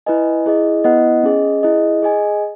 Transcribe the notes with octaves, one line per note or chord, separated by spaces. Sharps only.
E4 B4 D#5 G#5
E4 G#4 D#5
B3 E4 B4 D#5 F#5
C#4 G#4 D#5
E4 G#4 D#5
G#4 D#5 G#5